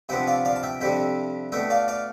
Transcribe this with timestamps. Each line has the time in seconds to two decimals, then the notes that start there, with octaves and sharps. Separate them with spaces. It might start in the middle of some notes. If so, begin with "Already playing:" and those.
0.09 C3 F3 B3 D4 E5 G5
0.27 D5 F5
0.45 D5 F5
0.56 A5
0.63 E5 G5
0.80 F2 C3 G3 D4 E5 G5
1.52 B2 A3 D4 E5 G5
1.70 D5 F5
1.88 D5 F5